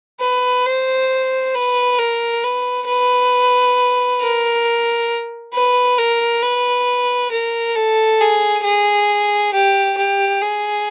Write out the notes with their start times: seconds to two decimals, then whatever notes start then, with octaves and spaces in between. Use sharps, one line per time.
0.21 B4
0.66 C5
1.55 B4
1.99 A#4
2.44 B4
2.87 B4
4.21 A#4
5.54 B4
5.98 A#4
6.42 B4
7.32 A#4
7.75 A4
8.20 G#4
8.64 G#4
9.53 G4
9.97 G4
10.41 G#4